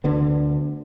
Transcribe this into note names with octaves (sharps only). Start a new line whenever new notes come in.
D2 D3 B3